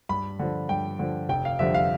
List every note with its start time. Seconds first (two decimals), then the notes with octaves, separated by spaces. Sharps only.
0.09 G2 B5
0.39 D3 F3
0.69 G2 G5
0.99 D3 F3
1.29 F1 G5
1.45 F5
1.59 F2 D3 G3 C4 E5
1.74 F5